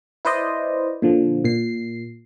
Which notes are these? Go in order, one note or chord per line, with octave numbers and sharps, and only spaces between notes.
E4 B4 C5 D5 D#5
A#2 D3 F3
A#2 C7